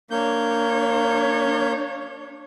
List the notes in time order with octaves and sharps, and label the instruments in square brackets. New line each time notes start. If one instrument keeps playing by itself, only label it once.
[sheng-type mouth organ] A#3 G6 [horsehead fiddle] D4 C#5